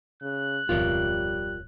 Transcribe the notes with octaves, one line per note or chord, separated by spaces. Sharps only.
C#3 F#6
D1 F2 B2 G3 F4 A#4 C#5